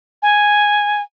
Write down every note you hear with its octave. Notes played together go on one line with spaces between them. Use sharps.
G#5